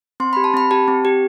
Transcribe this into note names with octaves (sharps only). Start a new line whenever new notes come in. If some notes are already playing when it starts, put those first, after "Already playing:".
C4 C6
G4 B5
A5
C4 B5
G4 A5
C4
G4